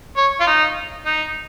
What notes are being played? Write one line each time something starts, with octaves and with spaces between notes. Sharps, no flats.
C#5
F4
D#4
D#4